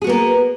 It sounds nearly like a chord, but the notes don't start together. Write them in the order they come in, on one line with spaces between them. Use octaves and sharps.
G#4 F#4 B3 A#3